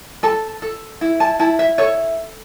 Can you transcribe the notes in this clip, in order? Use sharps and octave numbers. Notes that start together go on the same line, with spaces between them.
A4 A5
A4
E4
A5
E4 A5
E5
A4 C#5